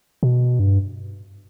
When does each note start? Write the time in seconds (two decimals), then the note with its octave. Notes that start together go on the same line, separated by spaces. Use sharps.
0.23 B2
0.59 G2